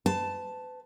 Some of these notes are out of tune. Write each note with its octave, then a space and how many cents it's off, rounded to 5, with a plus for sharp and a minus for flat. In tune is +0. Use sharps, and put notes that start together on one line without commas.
B4 +40 A5 +0